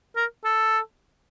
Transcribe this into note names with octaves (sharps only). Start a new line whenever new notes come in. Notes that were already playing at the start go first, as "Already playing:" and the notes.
A#4
A4